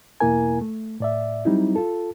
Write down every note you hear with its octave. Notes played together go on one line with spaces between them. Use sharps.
E2 B2 A#3 E4 A#4 G#5
A3
A2 D5 E5
F#3 G3 C4 D#4 E4
F4 A4